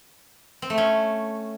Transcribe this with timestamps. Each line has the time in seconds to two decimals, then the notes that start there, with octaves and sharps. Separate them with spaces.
0.62 C4
0.70 A3
0.78 C#4